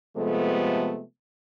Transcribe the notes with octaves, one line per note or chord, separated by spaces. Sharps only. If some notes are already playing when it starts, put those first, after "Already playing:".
C3 F3 G#3 A3 B3 A4